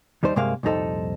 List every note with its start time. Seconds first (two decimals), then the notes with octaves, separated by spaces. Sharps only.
0.23 D#2 G3 D#4 C5
0.36 G2 C3 G#3 A#3 F5
0.63 C2 F2 A#2 D#4 A4 C5